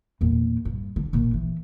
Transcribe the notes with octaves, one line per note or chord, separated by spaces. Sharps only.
E2 A#2
G2
D3
A#1 A#2
E3